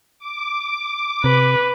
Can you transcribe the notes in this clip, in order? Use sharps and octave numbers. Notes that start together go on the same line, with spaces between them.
D6
C3 B4